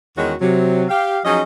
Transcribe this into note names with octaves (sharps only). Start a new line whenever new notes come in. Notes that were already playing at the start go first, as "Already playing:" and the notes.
E2 D#3 G#3 C#4 F#4
C3 F#3
G4 F5
F3 F#3 C#4 D#4 G#4 D#5